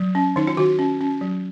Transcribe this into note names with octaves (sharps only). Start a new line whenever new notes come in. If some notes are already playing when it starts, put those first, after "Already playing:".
Already playing: F#3
C#4
D#3 D#4
F4
D#3 F#4
C#4
C#4
F#3